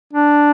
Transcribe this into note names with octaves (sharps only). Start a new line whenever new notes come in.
D4